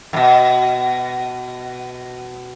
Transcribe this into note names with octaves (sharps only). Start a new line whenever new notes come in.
F2 B2